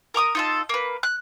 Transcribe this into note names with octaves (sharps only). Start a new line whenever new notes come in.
A#4 A#5 D6 D#6
D#4 F4 A4
A#3 B4
F#6